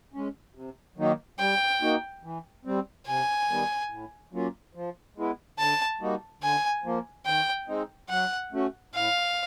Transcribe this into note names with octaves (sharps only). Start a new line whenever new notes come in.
G#3 C#4
C3
D#3 F#3 A#3 D#4
G3 G5
A#3 D#4 F#4
E3
G3 C4
C3 G#5
D#3 G3 B3
A2
F#3 A#3 C#4 F4
F3
G#3 B3 E4
D3 A5
G3 A#3 D#4 F#4
D3 G#5
F3 A#3
D#3 G5
G#3 C4 D#4
F#3 F#5
A3 C#4 F#4
A2 F5